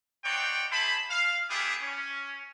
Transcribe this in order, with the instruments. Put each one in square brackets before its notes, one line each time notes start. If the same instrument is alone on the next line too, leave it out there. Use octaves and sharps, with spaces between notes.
[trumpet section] C4 D#4 C#5 D5 F#5 G5
G#4 C5 E5 A5 B5
F5
A3 B3 D4 E4 G4 G#4
C#4